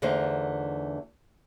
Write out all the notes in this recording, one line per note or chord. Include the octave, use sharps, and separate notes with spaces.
E2 D3 A3 D#4 F4 C5